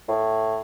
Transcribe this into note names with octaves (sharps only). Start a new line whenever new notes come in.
A2